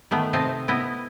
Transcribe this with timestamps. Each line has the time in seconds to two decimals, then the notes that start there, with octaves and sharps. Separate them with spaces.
0.11 D#3 A3 B3
0.33 C3 C4 D#5 A5
0.68 B3 E4 D#5